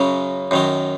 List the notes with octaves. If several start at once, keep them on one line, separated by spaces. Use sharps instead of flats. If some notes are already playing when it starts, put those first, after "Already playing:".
Already playing: F#2 C#3 F#3
F#2 D#3 F#3